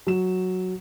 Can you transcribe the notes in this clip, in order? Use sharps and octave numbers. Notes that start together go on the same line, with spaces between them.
F#3 E7